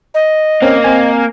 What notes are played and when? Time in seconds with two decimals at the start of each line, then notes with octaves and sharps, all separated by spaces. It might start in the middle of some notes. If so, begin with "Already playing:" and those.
0.14 D#5
0.62 A#3 C4 C#4
0.84 C4 G#5